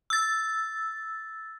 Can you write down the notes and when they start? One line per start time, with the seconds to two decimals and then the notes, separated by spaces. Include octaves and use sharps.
0.10 E6 A6